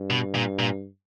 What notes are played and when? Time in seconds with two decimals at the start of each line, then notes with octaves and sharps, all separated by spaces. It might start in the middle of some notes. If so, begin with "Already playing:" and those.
Already playing: G2
0.10 B2
0.35 A#2
0.59 A#2